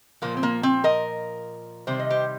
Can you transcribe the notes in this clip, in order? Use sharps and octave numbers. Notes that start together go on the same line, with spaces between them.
A#2 F3 A#3
C4
A#3
C4
A#4 D#5
C3 D#3 G3 C5
D#5
G4 C5